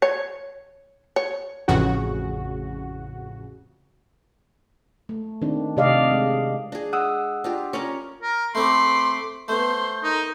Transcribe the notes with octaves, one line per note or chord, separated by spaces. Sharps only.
C#5
C#5
A1 F2 C#3 F#4
A3
D#3 C4 D4
C3 A3 G4 D5 D#5 F5
G#3
D4 G#4
G#3 F#5 D#6 E6
D4 F4 G4
C#4 A#4 D5
A#4
A3 C4 B5 C6 D6
A3 B3 C5 C6
D#4 A#4